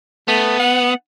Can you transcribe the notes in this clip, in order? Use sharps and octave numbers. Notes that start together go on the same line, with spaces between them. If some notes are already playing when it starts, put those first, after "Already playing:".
A3 B3
F#5